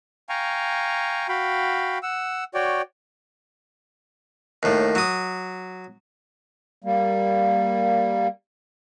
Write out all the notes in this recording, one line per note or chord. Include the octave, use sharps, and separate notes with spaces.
F5 G5 G#5 A#5 C#6
F#4 F5 G5 B5
F#5 E6
F#4 C#5 D5 G5
D#2 A2
F#3 D#6
G3 A#3